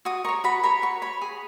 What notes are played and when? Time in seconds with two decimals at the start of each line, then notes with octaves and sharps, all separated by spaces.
0.05 F#4 D#6
0.25 A#4 C#5 C#6
0.44 F#4 B5
0.63 A#4 C#5 B5
0.82 F#4 C#6
1.02 C#5 B5
1.21 G#4